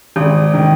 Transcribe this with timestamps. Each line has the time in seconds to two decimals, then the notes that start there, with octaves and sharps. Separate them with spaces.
0.16 G#1
0.54 D#3